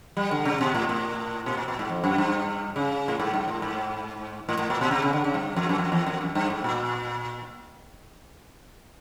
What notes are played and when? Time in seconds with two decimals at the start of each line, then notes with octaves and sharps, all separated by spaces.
0.17 G3
0.31 D3
0.45 C3
0.61 B2
0.74 A2
0.89 A2
1.46 B2
1.57 A#2
1.68 A#2
1.79 G#2
1.89 F2
2.04 F#2
2.18 G2
2.76 C#3
3.08 A2
3.20 G#2
3.34 G2
3.48 A2
3.62 G#2
4.49 A2
4.59 A2
4.70 A#2
4.81 B2
4.91 C3
5.02 C#3
5.13 D3
5.24 C#3
5.34 G2
5.56 F2
5.69 F#2
5.78 F2
5.92 E2
6.07 F2
6.21 F#2
6.35 G2
6.50 G#2
6.64 A#2